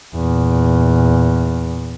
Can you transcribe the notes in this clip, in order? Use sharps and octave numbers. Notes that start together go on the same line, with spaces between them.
E2 A#2